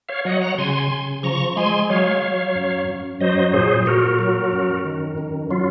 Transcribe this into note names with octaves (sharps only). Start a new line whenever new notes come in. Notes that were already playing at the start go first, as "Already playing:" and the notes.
C#5 F5
F#3 D#5 F#5
F#5 A#5
C#3 G#5 C6
C#3
F3 A#5 C#6
G#3 G#5 C6
F#3 C#5 F5
F#3
F#2
F#2
F#3 C5 D#5
A#2 G#4 C5
A#2 F#4 A#4
F#3
F#2
D#3
F#2
F#3 F4